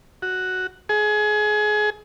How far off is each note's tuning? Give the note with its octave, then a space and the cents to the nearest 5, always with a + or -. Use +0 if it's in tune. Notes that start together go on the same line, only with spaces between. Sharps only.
F#4 +0
G#4 +25